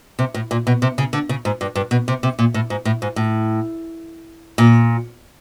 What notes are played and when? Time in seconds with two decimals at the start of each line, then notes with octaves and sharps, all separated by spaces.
0.19 C3
0.34 A2
0.51 A#2
0.67 B2
0.82 C3
0.98 C#3
1.13 D3
1.29 C#3
1.45 G#2
1.61 G2
1.75 G2
1.91 B2
2.08 C3
2.23 C3
2.39 A#2
2.54 A2
2.70 G#2
2.85 A2
3.02 G#2
3.16 A2
4.58 A#2